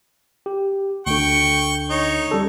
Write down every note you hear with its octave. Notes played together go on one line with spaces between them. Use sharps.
G4
D2 D3 G5 C#6
D#4 C#5
G3 C#4 A4